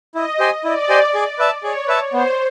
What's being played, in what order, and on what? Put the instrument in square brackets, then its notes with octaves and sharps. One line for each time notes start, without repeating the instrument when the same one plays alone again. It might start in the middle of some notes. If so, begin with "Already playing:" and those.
[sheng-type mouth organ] E4 [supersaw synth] D#5
[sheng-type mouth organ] G4 C5 D#5 G#5
[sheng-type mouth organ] E4 [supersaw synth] D5
[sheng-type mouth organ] G4 C5 D#5 G#5
G#4
B4 E5 A5
[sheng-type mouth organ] G#4 [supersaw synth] C#5
[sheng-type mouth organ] B4 E5 A5
[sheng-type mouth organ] B3 [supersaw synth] C5